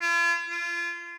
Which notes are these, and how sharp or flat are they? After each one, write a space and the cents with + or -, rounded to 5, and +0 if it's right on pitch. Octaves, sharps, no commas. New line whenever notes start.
F4 -45
F4 -25